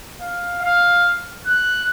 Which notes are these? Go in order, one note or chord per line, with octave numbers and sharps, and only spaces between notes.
F5
F5
F#6